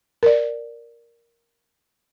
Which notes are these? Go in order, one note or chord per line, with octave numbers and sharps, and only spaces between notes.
A#4 D5